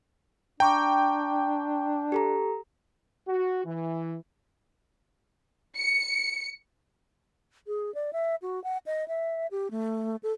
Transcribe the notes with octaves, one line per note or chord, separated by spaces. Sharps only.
D4 G5 A#5 C#6 D6
G4 A4 A#5
F#4
E3
C#7
G#4
D5
E5
F#4
F#5
D#5
E5
G4
A3
A4